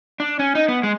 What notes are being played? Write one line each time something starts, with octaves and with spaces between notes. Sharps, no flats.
D4
C#4
D#4
B3
G#3